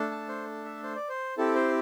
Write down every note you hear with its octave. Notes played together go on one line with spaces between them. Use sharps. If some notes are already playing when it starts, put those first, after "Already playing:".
Already playing: A3 D4 A4
A5
C5
E5
C5
D5
C5
C4 E4 G4 A4
C5